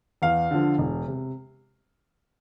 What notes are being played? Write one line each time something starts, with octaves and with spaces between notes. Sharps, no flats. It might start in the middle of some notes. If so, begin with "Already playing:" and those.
E2 F5
D3 F3
E1
C3